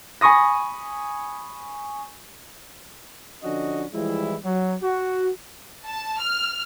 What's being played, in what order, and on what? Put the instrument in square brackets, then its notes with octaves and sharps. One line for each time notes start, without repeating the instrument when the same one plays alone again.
[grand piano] G#5 B5 C#6 D#6 A#6
[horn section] D3 F3 C#4 D4 F#4 D#5
E3 F3 G3 G#3 E4
F#3
F#4
[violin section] A5
F6